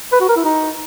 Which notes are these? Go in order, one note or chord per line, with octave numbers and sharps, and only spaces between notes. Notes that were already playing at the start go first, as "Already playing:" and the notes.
B4
F#4
A#4
E4
D#4